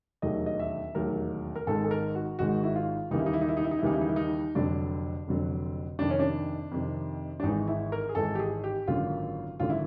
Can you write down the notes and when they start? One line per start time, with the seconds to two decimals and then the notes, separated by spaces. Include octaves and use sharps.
0.22 E1 D#2 D#3 F#3 A3 D#5
0.46 D#5
0.60 E5
0.95 E1 D#2 D#3 F#3 A3 A#4
1.55 A#4
1.67 G#1 G#2 D#3 G#3 A4
1.84 A4
1.91 A#4
2.15 F#4
2.39 G#1 G#2 D#3 G#3 F#4
2.64 E4
2.76 F4
3.11 D#2 C#3 E3 G3 A#3 D#4
3.19 E4
3.26 D#4
3.33 E4
3.41 D#4
3.48 E4
3.57 D#4
3.64 E4
3.71 D#4
3.79 E4
3.83 D#2 C#3 E3 G3 A#3 D#4
3.93 E4
4.01 D#4
4.09 E4
4.16 D#4
4.55 F1 F2 D3 F#3 D4
5.27 F1 F2 D3 F#3
5.99 F2 C3 D#3 D4
6.10 C#4
6.19 D4
6.72 F2 C3 D#3
7.40 D4
7.43 G#1 G#2 E3 D#4
7.68 E4
7.92 A#4
8.09 G#4
8.15 G#1 G#2 E3 A4
8.35 G4
8.39 G#4
8.64 G4
8.87 G#1 F#2 D3 F#3 A#3 F4
9.59 G#1 F#2 D3 F#3 A#3 F4
9.70 E4